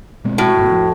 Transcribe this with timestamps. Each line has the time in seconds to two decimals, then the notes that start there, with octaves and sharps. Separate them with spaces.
0.25 B2 G#3 C4
0.38 A2 F#4
0.57 G1 G#2 B2
0.71 F2